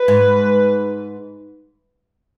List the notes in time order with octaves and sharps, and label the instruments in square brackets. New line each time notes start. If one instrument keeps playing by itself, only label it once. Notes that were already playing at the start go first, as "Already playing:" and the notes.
Already playing: [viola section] B4
[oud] G#2